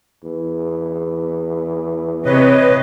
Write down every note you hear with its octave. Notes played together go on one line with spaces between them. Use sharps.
E2
C3 B4 C#5 D#5